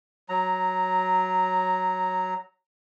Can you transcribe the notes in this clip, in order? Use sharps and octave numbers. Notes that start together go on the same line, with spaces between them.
F#3 A#5